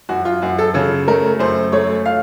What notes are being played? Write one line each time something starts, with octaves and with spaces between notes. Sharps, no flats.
F#2 F#4
F4
F#2 F#4
A4
C#3 A4
A3 A#4
F#2 C5
A3 C#5
F5